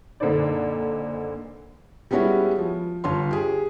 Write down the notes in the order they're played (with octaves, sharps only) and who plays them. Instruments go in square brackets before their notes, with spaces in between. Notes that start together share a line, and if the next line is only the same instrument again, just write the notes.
[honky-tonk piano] F#1 A#2 D3 C4 D#4 D5
[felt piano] G3 G#3 B3 C#4 E4 F#4
F3
G1 F4 C#5 C6
G4 G#4